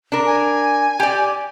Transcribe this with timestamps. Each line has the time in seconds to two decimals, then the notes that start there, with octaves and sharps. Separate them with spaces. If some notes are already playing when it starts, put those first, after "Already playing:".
0.12 D4 A#4
0.26 G#5
1.00 G4 D5